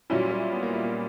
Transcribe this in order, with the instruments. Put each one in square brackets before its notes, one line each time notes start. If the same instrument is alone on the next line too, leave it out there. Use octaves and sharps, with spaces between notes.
[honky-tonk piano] A#2 F#3 C#4 E4 [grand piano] G3
[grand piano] G3
B3
A#3
G3
A#3